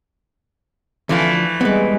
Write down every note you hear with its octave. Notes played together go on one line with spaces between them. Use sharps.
D2 E3 F3 A3 F5
G3 G#3 B3 B4